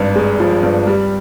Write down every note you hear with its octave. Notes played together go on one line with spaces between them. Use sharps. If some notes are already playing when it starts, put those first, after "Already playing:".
Already playing: G#1 G2
G#3
F3
G2
G3